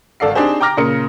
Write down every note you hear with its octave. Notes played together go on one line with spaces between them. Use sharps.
G#1 A4 D5 F5 C7
C4 D4 D#4 G4 G#4 C5
G5 A#5 D6 F6 A#6
A#2 C#3 A#4 C#7